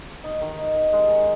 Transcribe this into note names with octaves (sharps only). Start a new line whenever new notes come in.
D#4
D#3
D#4
D#3
G#3
D#3